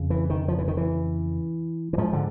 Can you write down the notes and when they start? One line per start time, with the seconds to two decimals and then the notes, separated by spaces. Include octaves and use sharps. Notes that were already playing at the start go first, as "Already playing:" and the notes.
Already playing: F2 C#3
0.10 E3
0.30 D#3
0.48 F3
0.58 E3
0.68 D#3
0.77 E3
1.93 E3
1.98 G#2 F3
2.13 D3